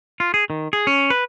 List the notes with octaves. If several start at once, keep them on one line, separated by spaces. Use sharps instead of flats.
F4
G#4
D#3
G#4
C#4
B4